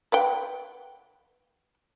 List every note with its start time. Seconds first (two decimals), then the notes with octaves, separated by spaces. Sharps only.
0.12 B4 F#5 G5